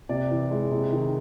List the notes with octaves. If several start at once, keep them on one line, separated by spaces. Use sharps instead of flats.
C3 D5
E3
G#3
C3
D#3